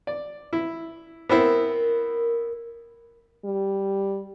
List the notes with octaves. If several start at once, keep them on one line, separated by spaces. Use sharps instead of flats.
D5
E4
B3 C4 E4 A#4
G3